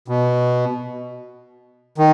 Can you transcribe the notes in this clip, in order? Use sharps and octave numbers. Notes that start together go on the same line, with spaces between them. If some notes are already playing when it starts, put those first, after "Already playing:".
B2
D#3